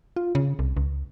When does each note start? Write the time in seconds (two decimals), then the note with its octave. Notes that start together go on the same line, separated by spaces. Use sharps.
0.16 F4
0.35 C#3
0.59 C2
0.77 C#2